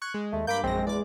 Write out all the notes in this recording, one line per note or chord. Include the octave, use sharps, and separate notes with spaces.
C#6 F#6 G#6
G#3
D#2 A3
G2 A#3 B5 D6 G6
A#1 F#2 G#3 C4 A#6
E2 D5 D6